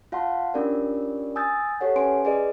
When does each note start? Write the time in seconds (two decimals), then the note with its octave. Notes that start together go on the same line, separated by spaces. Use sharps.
0.12 F4 F5 F#5 A5 C6
0.54 C#4 D4 F4 G4 A#4 D5
1.36 G#5 D#6 E6 G6 A6
1.80 G4 A4 C#5 F#5
1.96 C#4 B4 G#5 C6 D7
2.25 G#4 B4 D5 D#5